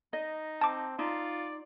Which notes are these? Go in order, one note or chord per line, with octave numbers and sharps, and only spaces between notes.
D#4 D#5
C4 A5 D6
D#4 F4 D5